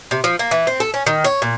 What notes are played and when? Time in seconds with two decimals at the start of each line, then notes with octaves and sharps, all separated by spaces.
0.11 C3
0.24 F3
0.39 A#3
0.51 E3
0.67 C4
0.80 A4
0.94 C#4
1.06 D#3
1.24 C#5
1.42 A#2